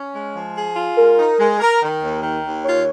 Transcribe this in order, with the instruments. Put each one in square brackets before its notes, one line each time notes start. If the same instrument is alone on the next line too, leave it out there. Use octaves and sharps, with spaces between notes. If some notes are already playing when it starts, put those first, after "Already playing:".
Already playing: [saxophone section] C#4
G#3
F3
G#4
F4
[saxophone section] G#3 [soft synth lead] A#4
[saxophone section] D#4
G#3
A#4
D#3
D#2
D#3
D#2
[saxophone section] F4 [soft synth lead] C#5